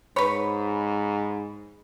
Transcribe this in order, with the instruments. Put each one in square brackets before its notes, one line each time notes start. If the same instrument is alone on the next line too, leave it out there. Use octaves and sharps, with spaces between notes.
[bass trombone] G#2 [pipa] B4 C#5 [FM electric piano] B5